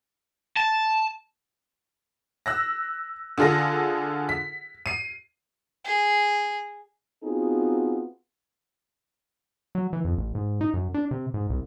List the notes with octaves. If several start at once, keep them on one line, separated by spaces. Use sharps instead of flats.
A5
E6 F#6 A#6
D3 F4 G#4 A4 A#6
B6
C7 D#7
G#4
B3 C4 D#4 F4 F#4 G#4
F#3
E3
F2
A1
G#2
D#4
F#2
D4
C3
G#2
C2